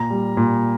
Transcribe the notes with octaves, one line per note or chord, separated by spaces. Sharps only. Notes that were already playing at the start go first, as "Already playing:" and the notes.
Already playing: A#2 A#5
G3
A#2